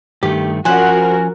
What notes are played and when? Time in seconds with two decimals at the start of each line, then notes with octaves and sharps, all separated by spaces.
0.23 G2 D#3 A3 G4
0.65 F3 C#4 F#4 A#4 C5 F#5 G#5